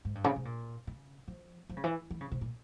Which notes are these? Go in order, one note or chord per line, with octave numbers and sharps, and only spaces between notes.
G#2
G2
C#3
C3
A#2
C#3
F3
F3
C#3
E3
E3
C#3
C3
A#2